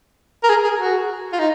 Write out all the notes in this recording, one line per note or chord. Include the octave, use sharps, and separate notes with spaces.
A#4
G#4
G#4
F#4
F4
D#4